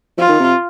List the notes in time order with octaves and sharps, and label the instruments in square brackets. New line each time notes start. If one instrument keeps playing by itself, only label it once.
[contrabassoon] F3 [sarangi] F4
[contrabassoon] D#3
C3